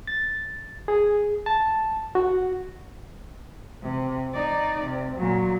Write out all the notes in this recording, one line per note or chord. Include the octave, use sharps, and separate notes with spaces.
A6
G#4
A5
F#4
C3
D#4 D5
C3
A#2 F#3